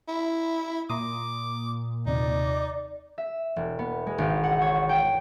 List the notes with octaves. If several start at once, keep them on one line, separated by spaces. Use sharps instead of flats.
E4
A#2 A#5 C6 D6 D#6
D#2 C3 D#4 D5
E5
E1
B3
G#3
G#1
F#5
C#5
G5